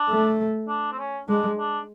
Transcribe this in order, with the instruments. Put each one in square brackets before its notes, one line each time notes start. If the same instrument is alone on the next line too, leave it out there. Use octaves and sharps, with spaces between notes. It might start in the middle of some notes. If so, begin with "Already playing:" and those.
Already playing: [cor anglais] D4
[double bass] A3
[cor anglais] D4
C4
C#4
[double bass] G#3 [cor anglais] D4
[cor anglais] D4